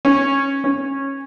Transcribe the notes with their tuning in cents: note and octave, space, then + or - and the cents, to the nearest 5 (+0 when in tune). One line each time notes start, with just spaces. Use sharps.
C#4 -15
C#4 -20